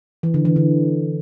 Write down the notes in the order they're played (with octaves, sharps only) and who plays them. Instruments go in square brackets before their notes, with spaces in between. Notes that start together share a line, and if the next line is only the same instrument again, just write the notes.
[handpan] E3
D3
E3
D3